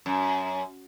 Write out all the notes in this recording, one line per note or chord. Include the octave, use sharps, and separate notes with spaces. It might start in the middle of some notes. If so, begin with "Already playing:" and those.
F#2